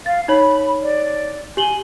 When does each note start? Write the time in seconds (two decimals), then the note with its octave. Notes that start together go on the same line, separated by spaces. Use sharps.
0.06 F5 A6
0.28 D#4 C#5 B5
0.82 D5
1.57 G4 G#5 F#7 G7